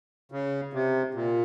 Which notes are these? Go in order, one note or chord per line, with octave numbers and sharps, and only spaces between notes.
C#3
C3
A#2